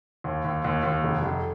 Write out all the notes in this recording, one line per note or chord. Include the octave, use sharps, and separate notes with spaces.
D#2
D#2
D#2
D#2
F1
F1